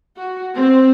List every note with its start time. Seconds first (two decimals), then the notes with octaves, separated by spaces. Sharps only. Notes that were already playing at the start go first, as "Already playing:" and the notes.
0.18 F#4
0.56 C4